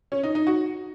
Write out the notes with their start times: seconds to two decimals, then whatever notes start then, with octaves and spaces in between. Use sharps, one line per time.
0.12 C#4
0.23 D#4
0.35 D#4
0.47 F#4